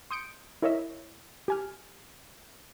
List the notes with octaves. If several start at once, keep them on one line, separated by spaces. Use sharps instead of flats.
C6 D#6 G6 C#7 D7
E4 A#4 C#5 D#5 E5
G4 G#5 F6